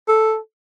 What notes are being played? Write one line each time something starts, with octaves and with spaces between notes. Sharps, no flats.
A4